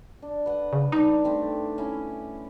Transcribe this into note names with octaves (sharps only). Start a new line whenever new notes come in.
D4
B4 F#5
C#3
G3 D4 D#4
A3 C4 G4
C#4 E4